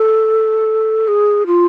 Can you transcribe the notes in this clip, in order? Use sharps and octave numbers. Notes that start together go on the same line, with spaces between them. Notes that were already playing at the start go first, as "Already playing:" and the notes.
Already playing: A4
G#4
F4